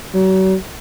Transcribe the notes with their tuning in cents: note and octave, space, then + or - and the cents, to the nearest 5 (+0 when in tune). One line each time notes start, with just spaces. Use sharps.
F#3 +40